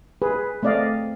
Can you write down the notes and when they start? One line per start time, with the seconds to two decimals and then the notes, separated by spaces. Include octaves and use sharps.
0.22 G#4 B4
0.63 A3 C4 D5 D#5 F5